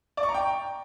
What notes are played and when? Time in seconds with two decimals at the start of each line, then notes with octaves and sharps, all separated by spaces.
0.17 D5
0.23 C#6
0.29 A#5
0.34 G5